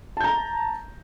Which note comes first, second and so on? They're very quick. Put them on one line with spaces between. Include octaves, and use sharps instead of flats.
A5 G6 A#5